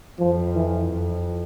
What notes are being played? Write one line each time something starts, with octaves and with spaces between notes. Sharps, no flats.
F2 F3
E3
F2